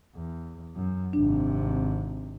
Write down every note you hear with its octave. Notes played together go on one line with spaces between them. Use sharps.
E2
F#2
G#1 C3 D4